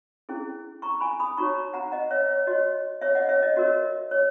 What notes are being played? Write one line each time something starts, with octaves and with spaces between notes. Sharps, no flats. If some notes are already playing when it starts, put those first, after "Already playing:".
C#4 E4 G#4
A#5 C#6
G#5 B5
B5 D#6
D#4 F#4 C#5 A#5 C#6
F#5 A#5
D#5 F#5
C#5 E5
C#5
F#4 C#5 D#5
C#5 E5
D#5 F#5
C#5 E5
D#5
F#4 A#4 C#5 D#5
C#5